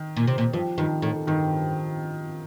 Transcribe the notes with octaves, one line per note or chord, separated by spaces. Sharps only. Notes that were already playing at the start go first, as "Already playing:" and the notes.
Already playing: D#3
A#2
C3
A#2
G2 F3
G2 D#3
A2 D#3
G2 D#3